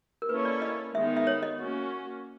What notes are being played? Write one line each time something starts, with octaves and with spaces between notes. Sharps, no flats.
A#4
A#3 C#4 E4 A4 B4 C#5
D5
D#5
D#3 G#3 B3 D#4 E5
E5
C#5
D#5
A#3 C#4 F#4